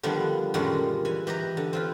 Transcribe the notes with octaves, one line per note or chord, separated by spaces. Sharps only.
D3 D#3 F3 G3 B3
F#2 A#2 D3 D#3 G3 G#3
E3 G#5
E3 G4 D#5 A#5
D3
C4 F4 B4